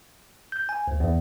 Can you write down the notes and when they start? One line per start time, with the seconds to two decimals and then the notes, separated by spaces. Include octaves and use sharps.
0.52 G6
0.69 G#5
0.88 D2
1.00 E2